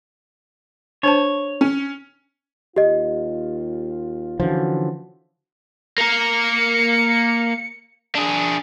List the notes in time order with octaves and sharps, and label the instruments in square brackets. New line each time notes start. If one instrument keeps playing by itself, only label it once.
[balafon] D4 C5 A5 [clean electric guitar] C#5
[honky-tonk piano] C#4
[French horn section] D#2 F4 [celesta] G4 D#5
[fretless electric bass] D3 E3 F3 [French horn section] C#4 F#4
[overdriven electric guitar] A#3 A#4 [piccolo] C#7
[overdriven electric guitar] D4 G#4